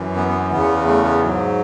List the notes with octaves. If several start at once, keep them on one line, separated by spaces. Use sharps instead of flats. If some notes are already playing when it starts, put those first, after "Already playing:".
Already playing: F#2 E3
B3
B3
E2 C#3 E3 B3
A3
B3
G#2 F#3